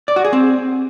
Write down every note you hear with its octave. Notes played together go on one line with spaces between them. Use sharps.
D5
F#4
G#4
C4